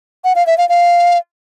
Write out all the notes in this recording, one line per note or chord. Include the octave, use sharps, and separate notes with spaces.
F#5
F5
E5
F5
F5